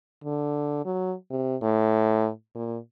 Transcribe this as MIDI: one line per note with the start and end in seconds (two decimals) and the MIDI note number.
0.24 0.81 50
0.85 1.14 54
1.31 1.56 48
1.62 2.29 45
2.55 2.78 46